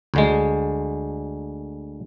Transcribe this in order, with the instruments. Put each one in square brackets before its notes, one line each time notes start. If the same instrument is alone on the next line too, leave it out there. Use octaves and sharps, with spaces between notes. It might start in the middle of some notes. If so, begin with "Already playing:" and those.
[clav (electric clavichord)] D2 D3 G#3